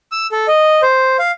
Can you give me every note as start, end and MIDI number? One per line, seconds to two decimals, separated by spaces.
0.12 0.27 88
0.32 0.47 69
0.48 0.81 75
0.82 1.17 72
1.19 1.31 77